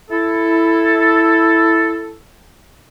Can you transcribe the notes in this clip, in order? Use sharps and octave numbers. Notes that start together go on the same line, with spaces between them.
E4 A4